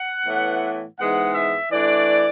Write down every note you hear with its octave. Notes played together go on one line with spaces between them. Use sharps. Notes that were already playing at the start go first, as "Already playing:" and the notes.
Already playing: F#5
A2 E3 B3
G#2 E3 G#3 B3 F#5
E5
E3 A3 D4 D5